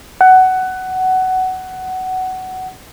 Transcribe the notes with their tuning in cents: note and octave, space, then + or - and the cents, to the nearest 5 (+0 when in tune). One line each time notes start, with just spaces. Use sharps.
F#5 +15